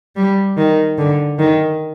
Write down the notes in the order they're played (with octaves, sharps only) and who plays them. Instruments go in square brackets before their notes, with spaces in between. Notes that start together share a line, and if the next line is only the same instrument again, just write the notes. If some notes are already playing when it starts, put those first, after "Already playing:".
[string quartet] G3
D#3
D3
D#3